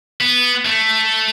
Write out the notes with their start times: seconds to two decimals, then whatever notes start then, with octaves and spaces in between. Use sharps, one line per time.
0.21 B3
0.66 A3